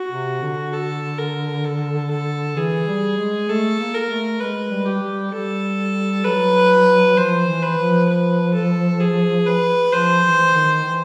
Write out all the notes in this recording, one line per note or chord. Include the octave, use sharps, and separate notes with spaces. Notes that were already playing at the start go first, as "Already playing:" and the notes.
Already playing: F#4
C3
D3
A4
A#4
A4
A4
E3 G#4
G3
G#3
A3 A4
A#3
A#4
A3
G#3 B4
G3
G4
G3
G3 A4
F#3 B4
F3 C5
E3
B4
F3
B4
A4
G#4
B4
F3 C5
E3
D#3
E3